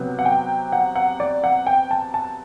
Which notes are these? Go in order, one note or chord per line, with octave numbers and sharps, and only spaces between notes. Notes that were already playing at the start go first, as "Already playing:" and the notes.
Already playing: C3 F#3 B3
F#5
G5
F#5
F#5
D5
F#5
G5
A5
A5